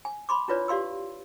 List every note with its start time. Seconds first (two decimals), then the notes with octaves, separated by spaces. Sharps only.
0.05 G#5
0.29 B5 C6 D6
0.48 D4 E4 F4 B4 C#5 D5
0.68 G4 D5 F5 C6 E6